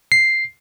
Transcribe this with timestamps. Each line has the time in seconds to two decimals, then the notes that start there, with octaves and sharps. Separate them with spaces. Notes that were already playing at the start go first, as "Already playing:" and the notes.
0.12 C7